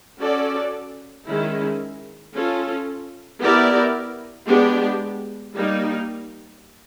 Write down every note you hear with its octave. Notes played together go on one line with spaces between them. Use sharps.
C#4 F#4 A4 D5
D#3 G#3 C#4 E4
C#4 F4 A4
B3 E4 G4 A#4 D5
G#3 B3 D4 G4
G3 A#3 D#4